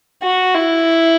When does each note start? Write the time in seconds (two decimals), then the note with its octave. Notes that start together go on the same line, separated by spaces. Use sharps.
0.23 F#4
0.54 E4